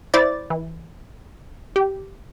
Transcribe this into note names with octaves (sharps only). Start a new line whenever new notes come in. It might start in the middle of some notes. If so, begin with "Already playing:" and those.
E4 C5 D5 D6 A6
E3
G4